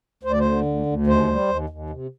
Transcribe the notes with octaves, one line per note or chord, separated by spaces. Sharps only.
D2 C5
D5
C5
D3
D2
D2
D#2 C5
G3
D#2
D#2
C3